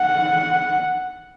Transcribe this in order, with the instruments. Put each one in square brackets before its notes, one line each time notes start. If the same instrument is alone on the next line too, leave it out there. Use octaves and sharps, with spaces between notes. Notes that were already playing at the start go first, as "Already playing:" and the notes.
Already playing: [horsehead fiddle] F#5